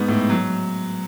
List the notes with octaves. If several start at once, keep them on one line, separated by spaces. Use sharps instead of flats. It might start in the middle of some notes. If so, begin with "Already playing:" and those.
Already playing: G#2 B3
A2
F#3